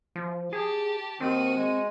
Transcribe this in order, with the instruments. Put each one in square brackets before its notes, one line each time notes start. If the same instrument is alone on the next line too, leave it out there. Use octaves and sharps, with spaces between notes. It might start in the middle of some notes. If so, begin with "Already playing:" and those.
[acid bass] F3
[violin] G4 A5 [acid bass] G#4
[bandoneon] D#2 D#3 [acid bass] C4 [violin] F#4 D#7
[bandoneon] G#3